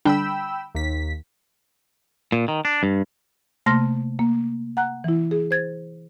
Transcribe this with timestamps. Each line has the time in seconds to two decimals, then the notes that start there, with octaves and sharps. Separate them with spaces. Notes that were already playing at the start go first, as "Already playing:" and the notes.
0.05 D3 G3 D4 G5 B5 E6
0.75 D#2 B6
2.32 A#2
2.48 D#3
2.65 D4
2.83 G2
3.66 C3 A3 A#3 C6 F6 A#6
4.19 A#3
4.77 F#5 A#5 F#6
5.04 E3 E4
5.31 G#4
5.51 C5 G#6 A6